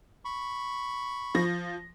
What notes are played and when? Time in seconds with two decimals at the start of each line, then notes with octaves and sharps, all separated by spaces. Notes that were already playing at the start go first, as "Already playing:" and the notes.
0.25 B5 C#6
1.35 F3 A#6